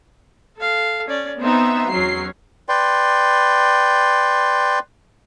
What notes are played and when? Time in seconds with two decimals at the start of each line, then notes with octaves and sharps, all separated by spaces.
0.57 A4 F5
1.08 C#4 D5
1.40 B3 C4 D#4 E5
1.91 E2 F#3 C#4 C7
2.69 B4 D5 G5 C6